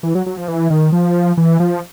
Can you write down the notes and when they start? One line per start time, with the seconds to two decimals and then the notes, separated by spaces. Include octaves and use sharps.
0.03 E3
0.15 F#3
0.26 F#3
0.37 F3
0.48 E3
0.70 D#3
0.92 F3
1.37 E3
1.60 F3